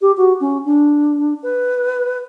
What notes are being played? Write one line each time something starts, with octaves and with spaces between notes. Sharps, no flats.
G4
F#4
C#4
D4
B4